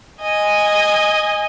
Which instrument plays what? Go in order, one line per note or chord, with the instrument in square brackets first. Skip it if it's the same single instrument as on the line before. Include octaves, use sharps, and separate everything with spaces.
[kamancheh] D#5 G#5